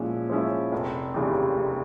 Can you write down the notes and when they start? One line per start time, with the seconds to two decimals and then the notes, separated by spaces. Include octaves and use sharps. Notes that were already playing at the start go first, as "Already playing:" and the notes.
Already playing: A#2 F3 G#3 C#4 E4
0.30 F3 G#3 C#4 E4
0.72 F1
1.14 D#2 C#3 E3 G3
1.57 F1